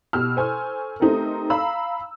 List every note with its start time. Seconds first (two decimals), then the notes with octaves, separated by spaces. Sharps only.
0.13 B2 G4 E6 F6
0.36 A4 C5 G#5 C#6 E6
1.00 A3 C4 D#4 G4 A4 A#4
1.50 F5 A#5 B5 E6